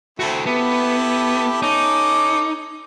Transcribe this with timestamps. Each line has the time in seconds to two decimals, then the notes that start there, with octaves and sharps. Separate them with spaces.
0.19 A3 C4 E4 F#4 A4
0.46 B3 E4 G4 A4
1.62 C#4 D#4 A4 D6